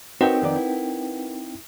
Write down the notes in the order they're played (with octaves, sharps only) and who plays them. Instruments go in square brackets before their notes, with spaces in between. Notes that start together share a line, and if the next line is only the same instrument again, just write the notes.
[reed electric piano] C4 D#4 G5 [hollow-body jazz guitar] F#4 C#5 [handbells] A#4 B4 F#5
[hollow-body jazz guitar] F2 D#3 D5
E4